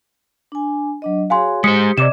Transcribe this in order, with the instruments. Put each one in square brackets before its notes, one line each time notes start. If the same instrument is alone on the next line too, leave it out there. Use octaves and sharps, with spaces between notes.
[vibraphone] D4 G#5
F#3 D4 D#5
[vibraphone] F#4 G#4 C#5 [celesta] F5 G#5 C6
[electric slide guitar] G#3 C5 [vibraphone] G4 [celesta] D#6 B6 C#7
[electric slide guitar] C3 [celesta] D5 D6 E7 [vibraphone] D#5